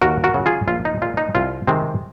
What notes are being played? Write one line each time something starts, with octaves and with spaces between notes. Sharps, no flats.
D#2 F#4 A#4
F#4 A#4
C#3 F#3
F4 G#4
A#1 F4
D#4
A#2 G#3 F4
D#4
C2 F4
C3 D#3 G#3 C4